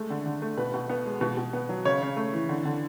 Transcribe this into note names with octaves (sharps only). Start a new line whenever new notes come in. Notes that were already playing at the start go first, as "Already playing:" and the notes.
Already playing: G#3 A3
D3
D3
A3
B2 B4
B2
B3
G#3
B2
B2
B3
F#3
C#3 C#5
C#3
A3
E3
D3
D3